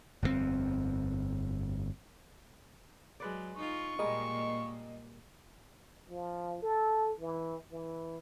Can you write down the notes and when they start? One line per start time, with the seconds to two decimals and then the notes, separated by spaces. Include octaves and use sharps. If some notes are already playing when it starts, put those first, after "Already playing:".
0.22 G1 F2 A#2 C4
3.20 F#3 G#3 B4 D5
3.57 D#4 F4 C#6
3.99 A#2 G3 G#3 A#3 A#4 D#5
6.09 F3
6.62 A4
7.21 E3
7.72 E3